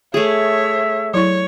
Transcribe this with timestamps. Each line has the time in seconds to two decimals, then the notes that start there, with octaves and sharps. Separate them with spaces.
0.14 A3 G#4 C#5 E5
1.14 F#3 E4 C#5 C#6